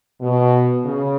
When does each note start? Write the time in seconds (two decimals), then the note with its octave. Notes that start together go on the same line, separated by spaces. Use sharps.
0.22 B2
0.85 C#3